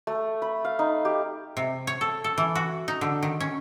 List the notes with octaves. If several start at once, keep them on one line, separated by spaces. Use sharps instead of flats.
A3
B5
F5
D#4
G4
C3
C#5
A4
A4
E3
F#4
D#4
D3
D#3
C#4